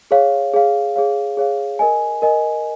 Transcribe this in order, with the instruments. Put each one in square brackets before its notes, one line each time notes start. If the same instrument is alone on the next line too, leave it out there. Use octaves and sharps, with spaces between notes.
[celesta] G#4 C#5 F5
G#4 C#5 F5
G#4 C#5 F5
G#4 C#5 F5
A#4 D#5 G#5
A#4 D#5 G#5